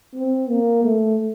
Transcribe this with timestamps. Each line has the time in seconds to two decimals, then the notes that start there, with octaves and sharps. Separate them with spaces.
0.14 C4
0.49 A#3
0.84 A3